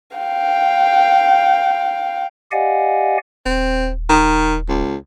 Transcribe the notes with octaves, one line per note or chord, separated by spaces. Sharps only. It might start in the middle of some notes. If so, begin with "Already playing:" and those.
F5 G5
G4 D5 D#5 F5 F#5 G#5
D#1 C4
D#3
C#2